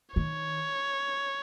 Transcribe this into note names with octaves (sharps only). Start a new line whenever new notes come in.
D#3 C#5